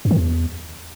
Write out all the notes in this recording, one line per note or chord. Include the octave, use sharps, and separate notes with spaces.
F#2
D#3
E2